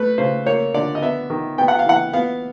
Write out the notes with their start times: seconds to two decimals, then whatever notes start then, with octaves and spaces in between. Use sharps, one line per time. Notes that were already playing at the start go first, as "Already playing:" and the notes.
Already playing: A3 B4
0.18 C#3 C5
0.46 A#3 C#5
0.74 D3 D5
0.95 D#5
1.02 B3 E5
1.30 D#3
1.58 B3 G5
1.68 F#5
1.79 F5
1.86 E3 F#5
2.13 B3 F5